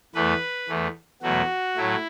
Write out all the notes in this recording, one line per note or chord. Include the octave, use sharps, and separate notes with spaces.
E2 E3 A3 B4
E2 E3 A3
E2 B2 F#3 A3 F#4
A2 F#3 A3 E4